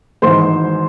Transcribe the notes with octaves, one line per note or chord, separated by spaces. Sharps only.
G#1 G#2 E3 G#3 C5 C6